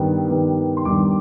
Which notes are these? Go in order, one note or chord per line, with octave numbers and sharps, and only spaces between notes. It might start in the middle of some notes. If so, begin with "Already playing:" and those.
Already playing: G2 D#3 G3 B3
G2 D#3 G3 B3
C6
G2 D#3 G3 B3 D6